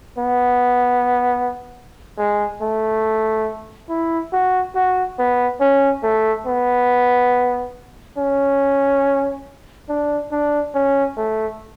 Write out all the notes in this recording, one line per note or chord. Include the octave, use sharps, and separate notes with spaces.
B3
G#3
A3
E4
F#4
F#4
B3
C#4
A3
B3
C#4
D4
D4
C#4
A3